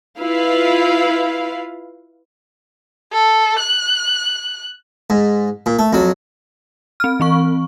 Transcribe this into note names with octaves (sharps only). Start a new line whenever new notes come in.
E4 F4 B4 F5
A4
F#6
G#2
A#2
A3
F2 F#3
C4 F6
E3 C4 C#6